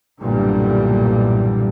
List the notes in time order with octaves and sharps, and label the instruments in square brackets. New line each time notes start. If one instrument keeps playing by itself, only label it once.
[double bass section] B1 G2 A#2 D3 E3 G3